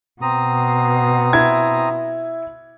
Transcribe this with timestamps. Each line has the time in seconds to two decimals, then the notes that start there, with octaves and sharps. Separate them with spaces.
0.22 B2 C4 A#5 D#6
1.33 E4 G#6